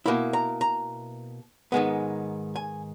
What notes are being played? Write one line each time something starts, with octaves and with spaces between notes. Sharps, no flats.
B2 A#3 E4 B5
A#5
A#5
G#2 D#3 G#3 B3
G#5